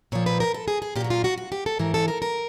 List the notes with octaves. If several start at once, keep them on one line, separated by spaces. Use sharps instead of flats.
A#2 F3 C#5
B4
A#4
A4
G#4
G#4
A#2 G4
F#3 F#4
F4
F#4
F#4
G4
A4
G#2 E3 A#4
A4
A#4
A#4